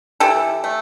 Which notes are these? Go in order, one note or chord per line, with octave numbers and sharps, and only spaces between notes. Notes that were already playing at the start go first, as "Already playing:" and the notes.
E3 G4 A4
A3